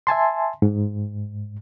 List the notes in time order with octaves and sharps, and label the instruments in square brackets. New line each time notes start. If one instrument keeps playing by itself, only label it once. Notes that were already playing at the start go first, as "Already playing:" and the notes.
[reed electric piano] E5 G#5 A5 C6
G#2